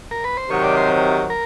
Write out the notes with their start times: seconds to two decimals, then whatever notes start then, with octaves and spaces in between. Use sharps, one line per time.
0.11 A#4
0.24 B4
0.37 C5
0.50 C3 D#3 F#3 C#5
0.63 D5
0.77 C5
1.30 A#4